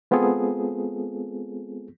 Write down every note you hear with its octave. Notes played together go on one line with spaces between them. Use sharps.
G#3 B3 C4 F4 G#4 A4